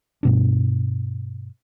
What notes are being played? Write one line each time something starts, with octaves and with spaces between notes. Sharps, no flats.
G2 B2 D4